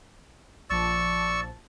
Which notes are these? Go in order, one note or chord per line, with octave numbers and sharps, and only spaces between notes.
A#1 F3 D5 A5 C#6 E6